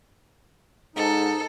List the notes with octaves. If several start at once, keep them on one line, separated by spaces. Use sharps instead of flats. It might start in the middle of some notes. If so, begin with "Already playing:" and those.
G#2 D#4 A4